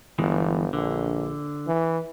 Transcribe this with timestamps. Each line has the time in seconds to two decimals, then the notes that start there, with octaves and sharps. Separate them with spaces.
0.19 G1 E2 E3 G#3
0.73 A#1 D3
1.67 E3